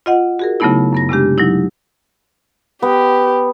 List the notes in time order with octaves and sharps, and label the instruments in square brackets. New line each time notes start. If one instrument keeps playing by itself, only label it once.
[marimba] F4 D#5 F#5
F#4 G#4 A#4
C#3 F#3 A3 B3 D#4 E4
F#2 B3 A#6
C3 G#3 D4 G4
F#3 D#4 E4
[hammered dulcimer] B3 [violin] G4